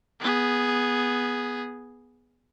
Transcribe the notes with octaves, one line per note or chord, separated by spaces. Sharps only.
B3 G#4